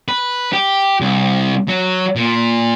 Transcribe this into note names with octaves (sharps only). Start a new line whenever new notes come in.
B4
G4
C2
F#3
A#2